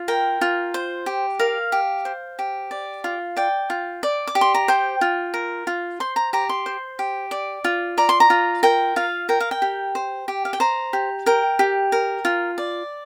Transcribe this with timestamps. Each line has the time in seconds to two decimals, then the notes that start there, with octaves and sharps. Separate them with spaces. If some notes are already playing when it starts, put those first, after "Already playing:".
Already playing: F4
0.08 A#4 G5
0.41 F4
0.74 C5
1.06 G4
1.40 A#4 F5
1.72 G4
2.05 C5
2.39 G4
2.71 D5
3.04 F4
3.37 D5 G5
3.70 F4
4.03 D5
4.27 D6
4.35 G4
4.41 C6
4.54 A#5
4.68 C5 G5
5.01 F4
5.34 A#4
5.67 F4
6.00 C5 C6
6.16 A#5
6.33 G4 A#5
6.49 C6
6.66 C5
6.99 G4
7.31 D5
7.64 F4
7.98 D5 A#5
8.09 C6
8.20 A#5
8.30 F4
8.63 A#4 G5
8.96 F4 F5
9.29 A#4 G5
9.40 F5
9.51 G5
9.62 G4
9.95 C5
10.28 G4
10.45 F5
10.53 G5
10.60 C5 A#5
10.93 G4
11.26 A#4 G5
11.59 G4
11.92 A#4
12.25 F4
12.58 D5